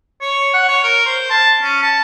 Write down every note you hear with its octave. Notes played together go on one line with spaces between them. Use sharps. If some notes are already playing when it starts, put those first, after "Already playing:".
C#5
F#5
C#5
A#4
C5
A5
C#4
A5